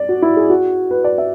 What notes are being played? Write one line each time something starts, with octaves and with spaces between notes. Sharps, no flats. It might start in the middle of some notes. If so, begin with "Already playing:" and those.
Already playing: D5
F#4
E4
G#4
F#4
B4
D5
E5